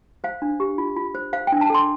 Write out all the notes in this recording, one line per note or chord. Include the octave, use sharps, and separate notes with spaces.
C5 F5
D4
G4
F4
F4
C5
C5 F5
G5
D4
A5
A4 C6